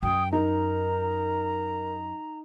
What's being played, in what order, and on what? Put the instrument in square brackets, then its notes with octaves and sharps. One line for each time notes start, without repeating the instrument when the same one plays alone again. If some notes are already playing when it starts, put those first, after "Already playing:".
[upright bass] F#2 [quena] G5 [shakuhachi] D#6
[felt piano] D#4 [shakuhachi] A#4 [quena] A#5